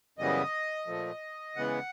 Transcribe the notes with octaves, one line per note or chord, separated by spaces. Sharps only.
F#2 C#3 E3 G3 B3 D#5
A#2 F3 A3
C#3 E3 G#3 B3 F#5